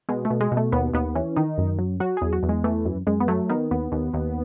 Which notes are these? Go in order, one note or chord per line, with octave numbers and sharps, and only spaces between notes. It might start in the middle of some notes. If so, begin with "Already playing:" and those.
B2 G#3
A3
B2
G#3
B2
A3
D#2 B3
D#2 B3
E3 C#4
D#3 D#4
F#2
F#3
F#3 F#4
E2 G#4
F#4
E2
G#3
E3 A3
F#2
F#2 G#3
B3
F#3 A3
D#3 B3
D#2 B3
D#2
D#2